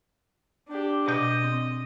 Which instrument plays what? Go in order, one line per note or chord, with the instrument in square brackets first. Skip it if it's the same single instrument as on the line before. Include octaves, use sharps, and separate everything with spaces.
[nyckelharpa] D4 G4
[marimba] B2 D6 G6 [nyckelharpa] D#5
[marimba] C4